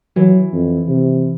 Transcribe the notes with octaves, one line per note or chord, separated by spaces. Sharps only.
E3 F#3
F2
C3